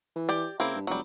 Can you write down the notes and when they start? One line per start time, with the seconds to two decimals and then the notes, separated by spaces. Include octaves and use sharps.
0.16 E3
0.29 G4 D5
0.60 C#3 A#3 C4 E4
0.75 G2
0.87 F1 F#3 G3